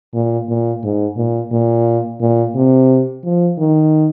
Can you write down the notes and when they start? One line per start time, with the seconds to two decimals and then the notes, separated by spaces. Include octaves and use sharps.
0.14 A#2
0.48 A#2
0.84 G#2
1.17 A#2
1.52 A#2
2.21 A#2
2.56 C3
3.25 F3
3.59 D#3